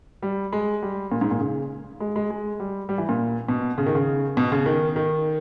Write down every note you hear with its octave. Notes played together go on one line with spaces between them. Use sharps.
G3
G#3
G3
A#2
G#2
A#2
C#3
G#3
G#3
G#3
G3
G3
E3
A#2
B2
C#3
D#3
C#3
B2
C#3
D#3
D#3